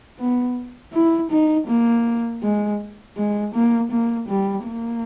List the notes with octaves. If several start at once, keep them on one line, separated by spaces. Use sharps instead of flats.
B3
E4
D#4
A#3
G#3
G#3
A#3
A#3
G3
A#3